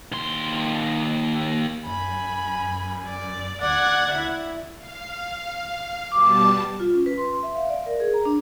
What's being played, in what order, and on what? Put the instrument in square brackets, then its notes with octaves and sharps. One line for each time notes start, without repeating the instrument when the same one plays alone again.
[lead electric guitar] D#2 C6
[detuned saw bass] F#2 [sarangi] G#5 [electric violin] B5
[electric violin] D5
[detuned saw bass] D2 [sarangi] D5 [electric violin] F#5 G#6
[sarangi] E4
[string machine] F5
[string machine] B2 G3 A5 [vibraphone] D6
[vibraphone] F4
C#4
B4
C6
E5
F5
D5
A#4
G#4
A#5
D4